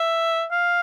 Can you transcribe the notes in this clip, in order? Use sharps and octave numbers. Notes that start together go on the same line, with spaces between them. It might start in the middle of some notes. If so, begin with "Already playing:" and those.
Already playing: E5
F5